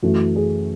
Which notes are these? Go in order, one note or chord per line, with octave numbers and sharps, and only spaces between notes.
F#2 E3 A3 F#4
G#4